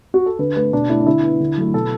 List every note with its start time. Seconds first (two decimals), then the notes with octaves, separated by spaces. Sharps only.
0.14 F#4
0.26 A4
0.39 D3 B4
0.56 A3 B4
0.73 B2 D4
0.90 A3 E4
1.01 D4
1.06 D3 E4
1.23 B3
1.40 D3
1.58 F#3 A3
1.74 B2 A4